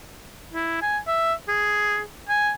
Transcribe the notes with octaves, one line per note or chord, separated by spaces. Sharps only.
E4
G#5
E5
G#4
G#5